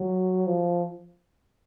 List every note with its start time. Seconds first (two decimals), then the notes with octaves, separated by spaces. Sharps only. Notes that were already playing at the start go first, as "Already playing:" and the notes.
Already playing: F#3
0.46 F3